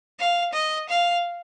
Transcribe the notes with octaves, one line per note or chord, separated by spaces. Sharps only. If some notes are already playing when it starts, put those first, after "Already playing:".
F5
D#5
F5